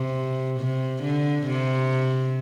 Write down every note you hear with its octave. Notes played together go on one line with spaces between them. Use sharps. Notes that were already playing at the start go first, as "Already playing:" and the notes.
Already playing: C3
C3
D3
C3